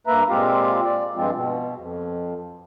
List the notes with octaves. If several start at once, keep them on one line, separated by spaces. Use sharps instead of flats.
G2 A#3 B4 E5 A#5
A#2 G#3 C4 F4 G4 F5
D5
G2 F3 G#3 C4 F4
B2
F2